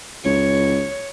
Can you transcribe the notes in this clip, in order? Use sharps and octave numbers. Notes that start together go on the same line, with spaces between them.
C#2 C#5